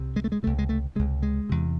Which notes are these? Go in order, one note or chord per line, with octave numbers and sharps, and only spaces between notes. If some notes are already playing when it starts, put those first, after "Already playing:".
Already playing: C2 C3
G#3
A3
G#3
C#2 C3 A3
G#3
A3
C#2 C3 G#3
G#3
E2 C3